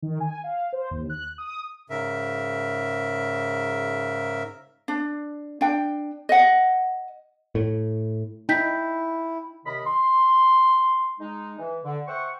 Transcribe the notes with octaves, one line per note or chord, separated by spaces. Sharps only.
D#3
G#5
F5
C5
D#2
F#6
D#6
G#2 C#3 A#4 E5
D4
D4 G5
D#5 F#5
A2
D#4 E4 G5 G6 B6
D#2 C3 D#3 D#5 B5
C6
G#3 D#4
E3
D3
C5 E5 F#5 G5 C#6